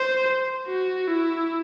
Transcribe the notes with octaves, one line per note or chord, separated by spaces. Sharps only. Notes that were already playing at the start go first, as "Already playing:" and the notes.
Already playing: C5
F#4
E4